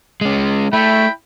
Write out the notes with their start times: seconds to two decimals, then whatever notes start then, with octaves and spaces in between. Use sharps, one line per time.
0.21 G#3 C#4
0.73 A3 E4 G5 B5